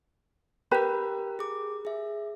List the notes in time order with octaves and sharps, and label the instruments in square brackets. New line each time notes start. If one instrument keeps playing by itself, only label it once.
[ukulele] G4 B4 B5 [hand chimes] A#4 A#5
[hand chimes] G#4 D6
G#4 E5